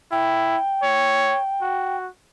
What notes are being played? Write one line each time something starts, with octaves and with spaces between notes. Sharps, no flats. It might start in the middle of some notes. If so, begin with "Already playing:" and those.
E4 G5
C#5
F#4